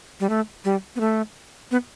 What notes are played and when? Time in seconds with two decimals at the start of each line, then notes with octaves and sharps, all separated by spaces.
0.20 G3
0.29 A3
0.65 G3
0.96 B3
1.00 A3
1.71 B3